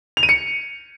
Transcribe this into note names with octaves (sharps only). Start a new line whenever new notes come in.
F7
D#7
C#7